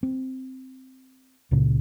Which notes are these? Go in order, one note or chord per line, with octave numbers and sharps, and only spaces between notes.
C4
C#2 A#2 C#3